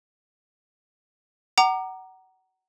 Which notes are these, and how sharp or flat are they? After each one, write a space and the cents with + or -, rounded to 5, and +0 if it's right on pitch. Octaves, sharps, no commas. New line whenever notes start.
F#5 +25 A#5 +0 D6 +30